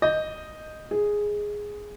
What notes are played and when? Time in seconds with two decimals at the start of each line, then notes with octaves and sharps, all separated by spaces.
0.02 D#5 G6
0.91 G#4